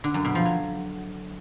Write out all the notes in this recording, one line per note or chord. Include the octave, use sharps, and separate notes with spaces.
D3
F#2
B2
F3
F#3